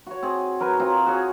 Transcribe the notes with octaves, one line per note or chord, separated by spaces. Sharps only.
F#4 C#5
C4 G#4
F#3 A#4 B4 G#5
F#3 C4 F4 D#5
F#4 G#4 C#5